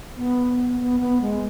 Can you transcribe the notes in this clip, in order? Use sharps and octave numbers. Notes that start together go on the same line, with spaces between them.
B3
B3
B3
G#3